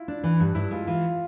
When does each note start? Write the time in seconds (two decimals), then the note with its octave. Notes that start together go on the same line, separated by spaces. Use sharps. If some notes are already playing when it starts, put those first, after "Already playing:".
Already playing: E4 F4
0.08 D4
0.24 E3
0.40 G2
0.55 G2 E4
0.71 G#3 F4
0.87 E3 F4